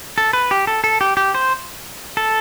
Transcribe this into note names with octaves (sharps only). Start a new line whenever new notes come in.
A4
B4
G4
A4
A4
G4
G4
C5
A4